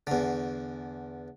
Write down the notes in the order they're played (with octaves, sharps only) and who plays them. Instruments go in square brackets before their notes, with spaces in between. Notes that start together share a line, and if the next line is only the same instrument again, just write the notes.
[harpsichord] E2 D3